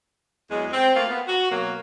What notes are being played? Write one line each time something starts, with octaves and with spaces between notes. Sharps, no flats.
E2 F#3 G#3
C4
A3 A#3 F4
B3
F#4
B2 F#3 A#3 F#4